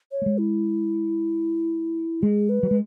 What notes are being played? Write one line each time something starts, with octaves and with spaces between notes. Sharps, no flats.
C#5
A3
G#3
E4
G#3 G#4
B4
F#3
G#3